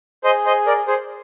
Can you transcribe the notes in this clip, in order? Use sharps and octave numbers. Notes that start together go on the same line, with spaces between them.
G#4 C5 D#5
C5 D#5
A#4 D5
G#4 C5